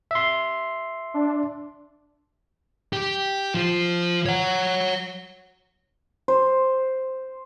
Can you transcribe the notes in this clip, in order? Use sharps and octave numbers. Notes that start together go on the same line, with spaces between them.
E5 C6
D4
G4
F3 F4
C#5 F#5
C5